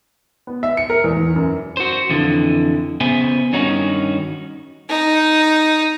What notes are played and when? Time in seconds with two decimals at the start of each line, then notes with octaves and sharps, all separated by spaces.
0.47 B3
0.63 E5
0.77 C#7
0.90 A#4
1.04 E2
1.16 E2
1.36 F#2
1.77 F#4 C5
2.10 F2 D3 E3
3.00 C#3 B3 C5 E5 G#5
3.53 G2 D#3 C#4 D#4 F#4
4.90 D#4